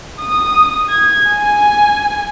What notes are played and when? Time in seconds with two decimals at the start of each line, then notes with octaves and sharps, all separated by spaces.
0.21 D#6
0.90 G#6
1.30 G#5